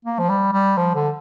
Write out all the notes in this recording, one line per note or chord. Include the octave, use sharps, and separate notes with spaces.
A#3
F3
G3
G3
F3
D3